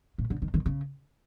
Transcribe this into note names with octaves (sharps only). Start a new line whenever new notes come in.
A2
D3
D#3
D#3
C#3